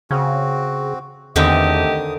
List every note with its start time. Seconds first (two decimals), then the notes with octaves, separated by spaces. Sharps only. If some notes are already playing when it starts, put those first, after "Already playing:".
0.11 C#3 C4 F#4
1.36 E2 D3 D#3 A3 C4 G4 D#5 D#6